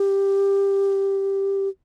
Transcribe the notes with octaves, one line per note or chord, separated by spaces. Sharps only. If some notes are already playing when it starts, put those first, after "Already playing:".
Already playing: G4